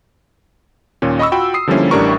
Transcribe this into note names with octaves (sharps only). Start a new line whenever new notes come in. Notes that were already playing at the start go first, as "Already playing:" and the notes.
D#2 A#2 C#4
D#5 B5 C#6 E6
F4 F#4 G5 B5
D#6 C7
D3 F3 G3 A#3 C#4 E4
A1 A2 G3 D4 A#4 C#6